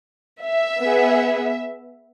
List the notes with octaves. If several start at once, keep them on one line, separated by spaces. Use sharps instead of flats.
E5
B3 G#4